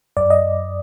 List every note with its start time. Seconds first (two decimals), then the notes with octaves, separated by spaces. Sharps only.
0.17 F#2 D5
0.30 D#5